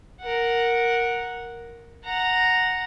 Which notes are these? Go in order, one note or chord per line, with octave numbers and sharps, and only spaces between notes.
A#4 F#5
F#5 A#5